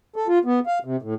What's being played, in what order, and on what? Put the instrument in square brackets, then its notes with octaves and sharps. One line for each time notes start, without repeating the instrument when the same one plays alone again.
[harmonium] A4
F4
B3
F5
C3
A2